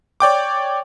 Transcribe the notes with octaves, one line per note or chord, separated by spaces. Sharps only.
C#5 D5 G5 D6